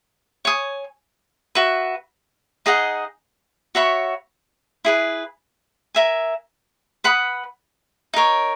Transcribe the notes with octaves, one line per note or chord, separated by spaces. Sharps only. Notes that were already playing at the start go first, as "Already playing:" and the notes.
C#5 G#5 D#6
F#4 B4 E5
D#4 G#4 D#5 F#5
F#4 C#5 E5 B5
E4 G#4 B4
A#4 E5 G#5
B4 F#5 B5 D#6
D#4 A#4 C#5